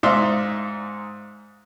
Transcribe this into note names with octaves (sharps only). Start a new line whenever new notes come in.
G#2 D#4 D5 E5 F5 C6